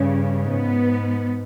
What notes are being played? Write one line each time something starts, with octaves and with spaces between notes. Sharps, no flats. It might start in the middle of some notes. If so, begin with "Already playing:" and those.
Already playing: G2 C#3
G#2 B3